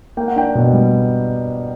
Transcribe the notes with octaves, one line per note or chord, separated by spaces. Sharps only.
A#3 G5
F#5
D4 G5
B2
G3